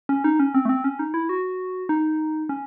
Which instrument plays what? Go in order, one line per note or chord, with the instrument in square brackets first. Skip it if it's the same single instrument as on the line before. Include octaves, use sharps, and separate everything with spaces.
[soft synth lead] C#4
D#4
C#4
C4
A3
C4
C#4
D#4
E4
F#4
D#4
C#4